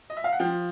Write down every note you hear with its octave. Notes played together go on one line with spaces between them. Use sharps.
D#5
E5
F5
F#5
F3 G5